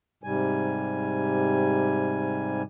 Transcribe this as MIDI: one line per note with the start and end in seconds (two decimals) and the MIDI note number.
0.24 2.62 44
0.24 2.62 48
0.24 2.62 55
0.24 2.62 80